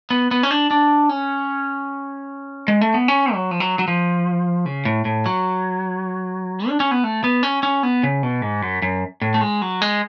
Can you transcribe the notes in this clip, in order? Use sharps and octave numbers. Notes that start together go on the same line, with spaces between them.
B3
B3
C#4
D4
D4
C#4
G#3
A3
B3
C#4
F#3
F3
F#3
F#3
F3
C#3
A2
A2
F#3
D4
C#4
B3
A3
B3
C#4
C#4
B3
C#3
B2
G#2
F#2
F#2
A2
A3
G#3
F#3
G#3